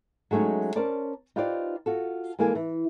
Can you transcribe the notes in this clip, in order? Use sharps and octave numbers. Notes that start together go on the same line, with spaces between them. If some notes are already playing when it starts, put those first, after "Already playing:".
F#3 G#3 A3 C#4 D#4
C#4 A#4 C5 D5 A5
D#4 F4 G4 B4 C5 D5
F4 F#4 A4
E3 G#3 A#3 A4 G#5
E3